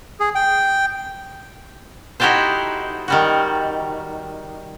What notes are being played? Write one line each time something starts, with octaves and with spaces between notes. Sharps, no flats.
G#4
G5
D#4 E4 F#4 G4 A4 C5
D#3 G3 F#4